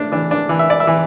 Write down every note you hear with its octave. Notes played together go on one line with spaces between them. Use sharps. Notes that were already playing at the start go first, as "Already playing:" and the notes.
Already playing: A2 D4
E3 D4
D4
E3
E5
D5
E5
E3